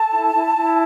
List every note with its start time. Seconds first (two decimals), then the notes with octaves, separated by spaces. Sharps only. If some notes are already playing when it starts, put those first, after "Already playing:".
Already playing: A4 A5
0.13 E4
0.35 E4
0.57 E4